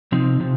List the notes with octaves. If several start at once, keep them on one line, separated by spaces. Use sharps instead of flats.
C3 F3 C4 D#4
C3 F3